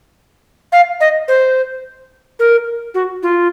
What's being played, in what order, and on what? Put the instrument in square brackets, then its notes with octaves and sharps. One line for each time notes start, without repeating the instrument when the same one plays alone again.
[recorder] F5
D#5
C5
A#4
F#4
F4